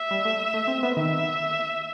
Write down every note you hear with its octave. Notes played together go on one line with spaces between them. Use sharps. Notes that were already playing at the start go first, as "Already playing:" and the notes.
Already playing: E5
G3
A3
A3
C4
B3
D#3 E5